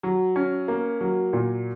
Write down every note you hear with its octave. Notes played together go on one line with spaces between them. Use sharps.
F#3
C#4
A#3
F#3
A#2